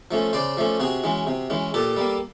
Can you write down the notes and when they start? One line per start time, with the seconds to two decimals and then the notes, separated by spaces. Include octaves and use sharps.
0.11 F3 A3 C#4
0.33 C#3 C5 D5
0.57 F3 A3 C#4
0.80 C3 F#4 G#4
1.04 E3 G#3 C#4
1.27 C3
1.50 E3 G#3 C#4
1.74 A#2 G4 A4
1.96 G3 A#3